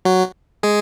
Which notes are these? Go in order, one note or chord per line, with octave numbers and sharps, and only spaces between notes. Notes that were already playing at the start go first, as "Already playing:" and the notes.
F#3 F#4
G#3 G#4